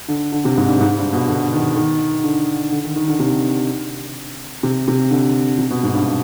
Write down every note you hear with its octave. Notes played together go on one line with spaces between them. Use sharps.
D3
D3
C3
G#2
G2
G#2
G2
B2
D3
D#3
D#3
D3
D3
D#3
D#3
D3
C3
C3
C3
D3
C3
B2
G#2
G2